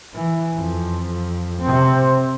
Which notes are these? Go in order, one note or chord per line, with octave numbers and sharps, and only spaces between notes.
E3
F2
C3 C4